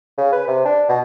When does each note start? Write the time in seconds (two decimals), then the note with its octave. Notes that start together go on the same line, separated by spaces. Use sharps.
0.17 C#3
0.32 B4
0.47 C3
0.65 D4
0.88 B2